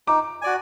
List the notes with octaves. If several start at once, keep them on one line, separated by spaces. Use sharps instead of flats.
D#4 D6
F#4 D5 G#5